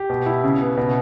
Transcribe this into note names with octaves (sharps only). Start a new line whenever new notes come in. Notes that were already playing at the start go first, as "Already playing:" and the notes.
Already playing: G4
B2
E4
C#3
B3
B2